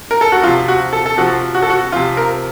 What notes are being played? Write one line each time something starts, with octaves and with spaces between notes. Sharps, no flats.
A#4
A4
F#4
C3 F3 F4
F#4
A4
A4
C3 F3 F#4
F#4
A4
F#4
C3 F3 F4
A#4